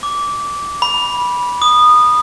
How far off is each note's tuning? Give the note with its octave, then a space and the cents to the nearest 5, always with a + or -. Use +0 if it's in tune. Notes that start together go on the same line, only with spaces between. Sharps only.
D6 -15
B5 -15
D#6 -20